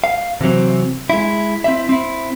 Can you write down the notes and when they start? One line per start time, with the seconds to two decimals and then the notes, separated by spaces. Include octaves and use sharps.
0.04 F5
0.41 C3 E3 F#3 C4
1.10 G#3 E4
1.64 C4 E4 E5
1.89 C4 E4